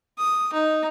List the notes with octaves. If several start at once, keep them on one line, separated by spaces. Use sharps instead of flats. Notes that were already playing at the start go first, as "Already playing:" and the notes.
D#6
D#4